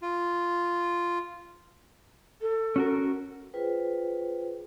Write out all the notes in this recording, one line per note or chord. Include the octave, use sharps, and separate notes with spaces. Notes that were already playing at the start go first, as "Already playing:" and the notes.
F4
A4
C#4 F#4 A#4
F4 G#4 B4 C5 G5